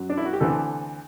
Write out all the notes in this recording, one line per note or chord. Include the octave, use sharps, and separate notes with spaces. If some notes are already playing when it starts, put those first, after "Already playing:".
Already playing: F#2 F#3
D4
E4
F#4
G4
D2 C3 E3 A4